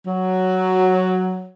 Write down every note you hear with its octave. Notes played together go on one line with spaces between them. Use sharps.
F#3